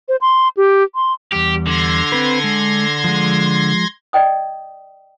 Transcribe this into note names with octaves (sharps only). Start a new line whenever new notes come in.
C5
C6
G4
C6
E2 G3 G4
D3 C6 G#6 A#6
C4 B4
G#3
F3 G#3
D5 D#5 G5 D#6